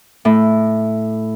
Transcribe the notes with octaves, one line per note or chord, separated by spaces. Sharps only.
A2